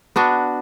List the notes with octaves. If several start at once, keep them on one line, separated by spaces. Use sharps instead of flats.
B3 D4 F#4